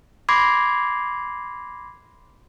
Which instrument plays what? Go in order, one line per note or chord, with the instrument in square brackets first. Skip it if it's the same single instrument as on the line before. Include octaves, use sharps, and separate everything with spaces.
[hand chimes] B5 C6 D6 G#6 A#6 C7